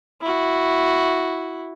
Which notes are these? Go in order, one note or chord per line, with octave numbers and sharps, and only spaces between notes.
E4 F#4